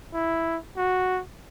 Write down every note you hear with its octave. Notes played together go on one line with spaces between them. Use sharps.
E4
F#4